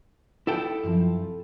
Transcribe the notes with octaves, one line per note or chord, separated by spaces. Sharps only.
E4 A4 D#5 F#5 G5
F#2 C3 F3